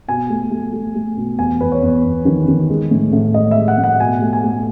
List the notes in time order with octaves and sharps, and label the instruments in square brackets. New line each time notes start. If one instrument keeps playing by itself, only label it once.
[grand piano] B2 G#5
A3
A3
A3
A3
B2
E2 G#5
E2 B4
C#5
E2
E2
D#3
D#3
G#3
A2
A2
G#3 D#5
E5
G#3
F#5
A2
F#5
B2 G#5
A3
G#5
A3